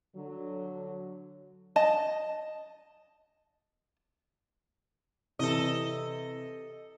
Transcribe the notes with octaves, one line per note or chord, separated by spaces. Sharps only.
D3 F#3
D#5 A5
C3 E3 A4 D#5